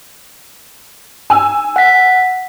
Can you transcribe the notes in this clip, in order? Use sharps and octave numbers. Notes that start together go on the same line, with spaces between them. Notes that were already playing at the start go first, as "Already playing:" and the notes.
G#5 E6
F#5 B6